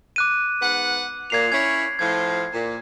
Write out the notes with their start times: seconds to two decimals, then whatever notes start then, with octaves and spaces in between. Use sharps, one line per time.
0.16 D6 F#6 D#7
0.60 G#2 B3 F#5
1.30 A#2 G#6 C7 F7
1.52 C#4 E4 C#5 G#6
1.99 A2 F3 G#6
2.52 A#2